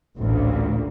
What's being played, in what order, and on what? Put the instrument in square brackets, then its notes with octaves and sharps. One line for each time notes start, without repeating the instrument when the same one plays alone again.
[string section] A1 D2 A#2